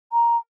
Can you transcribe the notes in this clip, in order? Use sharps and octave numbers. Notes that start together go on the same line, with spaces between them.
A#5